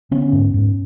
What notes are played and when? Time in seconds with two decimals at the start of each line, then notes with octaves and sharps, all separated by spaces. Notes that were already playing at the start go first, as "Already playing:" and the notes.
0.11 D3 B3 C#4
0.33 G#2
0.54 G#2